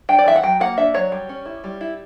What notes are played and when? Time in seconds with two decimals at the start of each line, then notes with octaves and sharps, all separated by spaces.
0.09 D4 G5
0.19 D5
0.26 E3 E5
0.36 F#5
0.43 F#3 G5
0.60 A#3 F#5
0.78 D4 E5
0.94 F#3 C#5
1.12 G3
1.29 C#4
1.46 E4
1.64 G3
1.81 E4